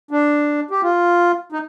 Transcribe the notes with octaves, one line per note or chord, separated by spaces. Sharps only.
D4
G4
F4
D#4